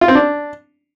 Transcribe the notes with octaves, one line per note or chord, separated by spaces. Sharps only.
F4
C4
D4